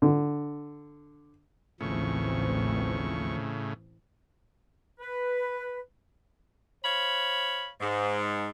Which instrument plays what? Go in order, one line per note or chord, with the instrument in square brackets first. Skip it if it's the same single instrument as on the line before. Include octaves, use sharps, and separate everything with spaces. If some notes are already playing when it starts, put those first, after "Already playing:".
[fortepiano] D3
[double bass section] A1 E3 C4 [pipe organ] D#2 F3 C#6 [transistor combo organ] A2 C#3
[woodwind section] B4
[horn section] C5 C#5 F5 B5
G#2